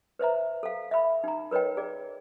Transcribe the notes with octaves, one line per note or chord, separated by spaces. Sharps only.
B4 C5 E5 A#5
A4 F5
E5 B5
D#4 A#5
A#4 B4 C#5 D#5 G5
G#4 D5